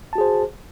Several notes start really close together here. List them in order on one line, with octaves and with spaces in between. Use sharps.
A5 F#4 G#4 C5